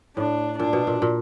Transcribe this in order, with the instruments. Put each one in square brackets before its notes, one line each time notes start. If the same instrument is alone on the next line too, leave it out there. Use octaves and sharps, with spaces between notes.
[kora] A2 [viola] D4
[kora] A#2 [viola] D4
[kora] B2
A#2
A#2